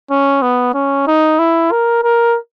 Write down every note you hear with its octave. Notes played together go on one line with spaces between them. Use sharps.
C#4
B3
C#4
D#4
E4
A#4
A#4